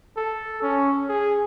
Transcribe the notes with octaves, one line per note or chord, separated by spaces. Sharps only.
A4
C#4
G#4